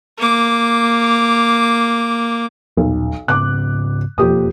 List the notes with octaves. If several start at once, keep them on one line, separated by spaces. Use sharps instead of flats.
A#3 D6
D#1 B1
G#2 C#3 C4 D6 F#6
E1 F2 B2 A#3 G4 D#6